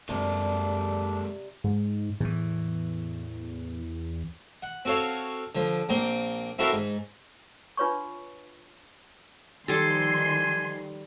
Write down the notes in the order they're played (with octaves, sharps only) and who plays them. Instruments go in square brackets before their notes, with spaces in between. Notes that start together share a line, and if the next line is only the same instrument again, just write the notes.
[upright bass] F#2 [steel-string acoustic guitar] C3 G3 [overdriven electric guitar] G#3 A#3 [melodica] D4
[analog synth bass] G#2
[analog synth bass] E2 [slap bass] A2 E3
[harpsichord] F#5
C4 F#4 A4 C#5 F5
D3 F3
A#1 A#3 C4 G5
C4 E4 F#4 A4 A#4 F5
G#2
[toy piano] D4 F4 B4 C#5 C6 C#6
[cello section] D#3 F3 [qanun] G3 A4 [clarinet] G#5 [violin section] C6 C7